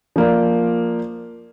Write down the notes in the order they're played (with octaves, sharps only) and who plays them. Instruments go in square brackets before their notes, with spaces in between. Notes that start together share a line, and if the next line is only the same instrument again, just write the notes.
[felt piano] F3 A#3 D5